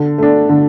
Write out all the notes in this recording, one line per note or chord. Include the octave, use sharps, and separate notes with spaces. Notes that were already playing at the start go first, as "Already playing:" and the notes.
Already playing: D3
A3 D4
D3